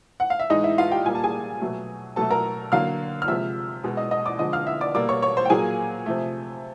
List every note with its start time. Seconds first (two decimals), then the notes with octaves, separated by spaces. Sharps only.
0.20 F#5
0.30 F5
0.40 E5
0.50 A2 E3 G#3 D#4 D#5
0.64 E4 E5
0.78 F4 F5
0.91 G4 G5
1.05 A#2 G3 A#3 G#5
1.15 A5
1.24 G#4 G#5
1.61 B2 F#3 A3
2.16 B2 F#3 A3 A4 A5
2.30 A#4 A#5
2.72 D3 F#3 A#3 F5 F6
3.22 F6
3.28 C3 F3 G#3 E5 E6
3.84 B2 G#3
3.97 D#5 D#6
4.11 D#5 D#6
4.25 D5 D6
4.39 D3 F3 G#3 D#5 D#6
4.53 F5 F6
4.67 E5 E6
4.81 D5 D6
4.94 B2 G3 A#3 D5 D6
5.09 C#5 C#6
5.22 C#5 C#6
5.37 C5 C6
5.45 G5
5.50 A#2 F#3 A#3 G#4 G#5
6.06 C3 F3 A3